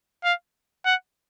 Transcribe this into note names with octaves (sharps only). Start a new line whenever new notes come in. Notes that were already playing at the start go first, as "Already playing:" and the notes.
F5
F#5